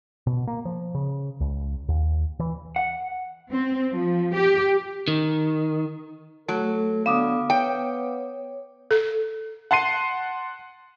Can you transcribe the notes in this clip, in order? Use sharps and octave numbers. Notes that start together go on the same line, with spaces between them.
B2
A#3
F3
C#3
C#2
D#2
E3
F#5
C4
F3
G4
D#3
F#3 A3 A4
D3 B3 F5 D6 D#6
B3 C#5 G5
A4
F#5 A5 C6 C7 D#7